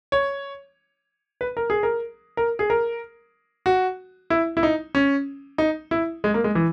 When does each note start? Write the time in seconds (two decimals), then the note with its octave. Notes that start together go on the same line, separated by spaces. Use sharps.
0.12 C#5
1.41 B4
1.57 A#4
1.70 G#4
1.83 A#4
2.37 A#4
2.59 G#4
2.70 A#4
3.66 F#4
4.30 E4
4.57 E4
4.63 D#4
4.95 C#4
5.58 D#4
5.91 E4
6.24 G#3
6.34 A#3
6.44 G#3
6.55 E3